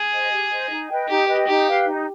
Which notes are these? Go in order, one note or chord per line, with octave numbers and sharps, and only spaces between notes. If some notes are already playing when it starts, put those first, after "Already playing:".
Already playing: G#4
C5 D#5
G4
C5 D#5
D#4
B4 D#5 G5
D#4 G4
B4 D#5 G5
D#4 G4
B4 F5
D#4